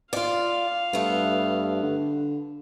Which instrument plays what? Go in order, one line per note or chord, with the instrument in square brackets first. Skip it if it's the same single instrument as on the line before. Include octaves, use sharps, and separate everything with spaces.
[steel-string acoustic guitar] F4 D5 [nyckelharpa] F5
[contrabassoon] G2 [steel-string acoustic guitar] A3 B3
[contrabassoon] D3